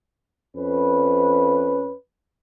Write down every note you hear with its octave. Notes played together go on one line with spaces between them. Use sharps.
F2 C#4 B4